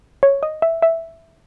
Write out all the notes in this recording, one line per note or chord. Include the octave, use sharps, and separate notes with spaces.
C#5
D#5
E5
E5